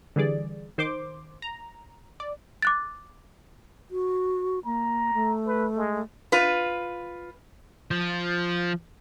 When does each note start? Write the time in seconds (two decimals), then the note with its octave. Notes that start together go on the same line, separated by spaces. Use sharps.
0.16 D3 E3 G3 G#4 D5
0.78 D#3 C5 C6 D6
1.42 A#5
2.20 D5
2.62 D6 F#6 A6
3.91 F#4
4.65 A#3 A#5
5.14 A3
5.47 B4
5.77 G#3
6.32 F4 B4
7.91 F3